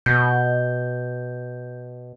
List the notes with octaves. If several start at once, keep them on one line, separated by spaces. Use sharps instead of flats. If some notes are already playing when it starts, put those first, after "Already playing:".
B2 G6